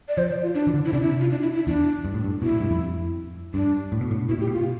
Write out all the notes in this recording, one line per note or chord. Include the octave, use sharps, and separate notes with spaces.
D5
F3 C5
D5
F4
D4
E3
D3
E4
C3 D4
E4
F4
D4
E4
E4
E2 D4
G2
A2
G2
B2 E4
A2
G2
F2
G2 D4
A2
B2
A2
B2 E4
A2 G4
B2
F4